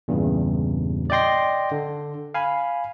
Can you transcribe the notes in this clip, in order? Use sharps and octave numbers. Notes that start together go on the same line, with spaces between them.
E2 G2 A#2 C#3
D5 D#5 G5 C6 A#6
D3
F5 G#5 B5